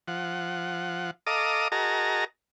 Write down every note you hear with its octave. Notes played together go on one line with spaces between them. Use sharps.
F3 F#5
A4 D#5 F5 A#5 D6 D#6
F#4 G#4 A#4 D#5 A5 A#5